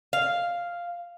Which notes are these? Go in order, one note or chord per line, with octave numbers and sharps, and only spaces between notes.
F5